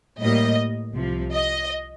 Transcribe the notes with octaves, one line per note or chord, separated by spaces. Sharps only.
A2 G3 A#3 D#5
C2 C3 F3
D#5